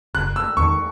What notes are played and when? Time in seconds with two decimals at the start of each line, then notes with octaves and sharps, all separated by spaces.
0.15 F#1 F#6
0.36 E6
0.57 E2 D#3 C#6